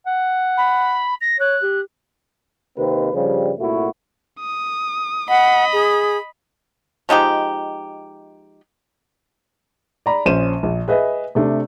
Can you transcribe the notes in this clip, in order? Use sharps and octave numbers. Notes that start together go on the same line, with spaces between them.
F#5
B5
A#6
C#5 F#6
G4
D#2 C3 D#3 A#3 C4 B4
G2 C#3 F3 G3
C2 A#2 A3 E4 F#4
D#6
D#5 F#5 B5
G#4
F3 G#3 D#4 G4
D5 A#5 B5
A#1 C#4 C5 D#7 E7
A#1
G#4 B4 D#5 E5
C3 A3 D4